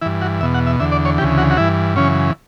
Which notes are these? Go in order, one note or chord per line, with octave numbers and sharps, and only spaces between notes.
G2 E3 E4
F#4
E2 B2 E5
F#5
E5
E2 D3 E5
D5
C#5
D2 C#3 E3 G4
F#4
F#4
G2 E3 E4
F#2 C#3 E3 C#4